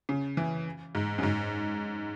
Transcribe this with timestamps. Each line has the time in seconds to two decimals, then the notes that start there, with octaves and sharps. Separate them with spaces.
0.09 C#3
0.37 E3
0.95 G#2
1.18 F#2
1.23 G#2